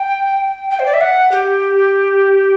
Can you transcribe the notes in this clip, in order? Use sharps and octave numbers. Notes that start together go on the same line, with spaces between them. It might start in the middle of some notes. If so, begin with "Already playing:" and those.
Already playing: G5
G5
C5
D5
E5
F#5
G4